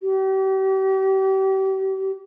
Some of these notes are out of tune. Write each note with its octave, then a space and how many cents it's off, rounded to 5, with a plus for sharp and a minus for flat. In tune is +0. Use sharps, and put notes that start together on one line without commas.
G4 -35